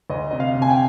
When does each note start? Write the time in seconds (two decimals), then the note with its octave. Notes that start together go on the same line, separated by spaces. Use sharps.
0.10 D2 D#5
0.31 C3 D#5
0.40 F5
0.55 C3
0.62 G#5
0.70 G5